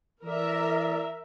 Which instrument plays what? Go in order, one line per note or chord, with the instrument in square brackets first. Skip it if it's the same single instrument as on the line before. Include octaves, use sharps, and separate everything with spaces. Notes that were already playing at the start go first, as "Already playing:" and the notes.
[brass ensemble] E3 D5 A#5 [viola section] A#4 E5